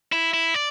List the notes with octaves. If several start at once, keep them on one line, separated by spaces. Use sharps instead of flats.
E4
E4
D5